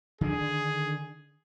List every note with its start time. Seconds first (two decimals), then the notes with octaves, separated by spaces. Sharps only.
0.21 D3 D#3 D4 G#4